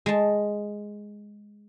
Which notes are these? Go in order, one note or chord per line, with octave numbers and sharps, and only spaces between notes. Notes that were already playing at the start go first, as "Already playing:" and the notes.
G#3 A5